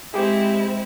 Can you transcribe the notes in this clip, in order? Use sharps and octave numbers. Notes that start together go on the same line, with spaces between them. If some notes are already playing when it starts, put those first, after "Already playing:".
G#3 C4 E4 G4 G#4